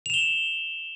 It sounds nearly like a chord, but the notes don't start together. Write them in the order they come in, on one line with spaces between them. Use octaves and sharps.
F7 E7 G7